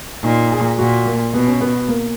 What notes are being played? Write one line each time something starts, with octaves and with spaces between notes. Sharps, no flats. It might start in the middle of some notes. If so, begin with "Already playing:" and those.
A#2 D#4
G#4
A#2 F#4
A#3
B2 B3
C#4
B3
A#3